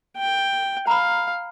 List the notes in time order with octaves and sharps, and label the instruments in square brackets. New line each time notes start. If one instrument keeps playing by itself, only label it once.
[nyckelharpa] G5
[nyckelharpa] F5 [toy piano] A#5 B5